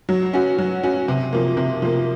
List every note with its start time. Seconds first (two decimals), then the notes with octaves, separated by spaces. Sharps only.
0.09 F#3
0.33 C#4 F#4
0.58 F#3
0.83 C#4 F#4
1.08 C3
1.33 F3 A#3
1.57 C3
1.82 F3 A#3